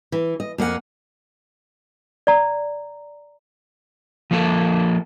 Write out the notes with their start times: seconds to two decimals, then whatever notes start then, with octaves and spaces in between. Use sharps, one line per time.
0.12 E3
0.40 D#5
0.58 F2 A#3 D#4 F#5 G#5
2.27 D5 A#5
4.31 F3 A#3 A4